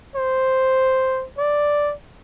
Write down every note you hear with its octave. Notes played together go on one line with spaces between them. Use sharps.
C5
D5